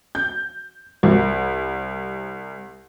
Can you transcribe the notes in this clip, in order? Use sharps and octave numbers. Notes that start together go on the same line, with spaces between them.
G6
C2